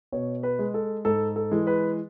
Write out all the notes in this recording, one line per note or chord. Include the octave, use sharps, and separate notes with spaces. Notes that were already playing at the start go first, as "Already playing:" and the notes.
B2 C#5
B4
G#3
A4
G#2 A4
A4
E3 G#3
B4